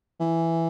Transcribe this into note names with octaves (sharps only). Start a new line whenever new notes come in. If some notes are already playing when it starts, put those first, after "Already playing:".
E3